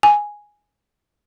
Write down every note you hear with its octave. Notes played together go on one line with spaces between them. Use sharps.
G#5